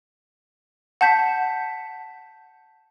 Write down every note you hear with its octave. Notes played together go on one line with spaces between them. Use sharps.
F#5 A5 G6 B6